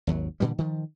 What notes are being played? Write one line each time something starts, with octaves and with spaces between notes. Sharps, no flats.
G#1 D#2 F#3
A#2 D3 E3 G3
D#3 F3